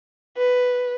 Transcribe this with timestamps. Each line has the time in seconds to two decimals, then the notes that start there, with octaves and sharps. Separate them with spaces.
0.37 B4